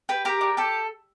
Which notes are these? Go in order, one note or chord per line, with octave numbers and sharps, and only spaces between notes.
G4 B4
G4 A#4
D4
G4 A4